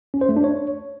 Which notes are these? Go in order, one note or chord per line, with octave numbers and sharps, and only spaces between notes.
C#4
C5
A3
D4
C#5